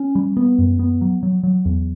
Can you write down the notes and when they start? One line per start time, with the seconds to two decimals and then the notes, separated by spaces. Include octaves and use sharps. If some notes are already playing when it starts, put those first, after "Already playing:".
Already playing: C#4
0.15 G3
0.37 B3
0.58 F#2
0.79 B3
1.01 F#3
1.23 F#3
1.44 F#3
1.65 E2